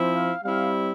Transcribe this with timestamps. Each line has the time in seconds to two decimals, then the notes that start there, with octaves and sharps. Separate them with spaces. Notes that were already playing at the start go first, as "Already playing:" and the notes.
Already playing: F3 C4 E4
0.14 F5
0.43 G3 C4 E4 F5